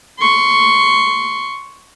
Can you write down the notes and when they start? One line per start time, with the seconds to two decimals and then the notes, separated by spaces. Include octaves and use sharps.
0.20 C6 C#6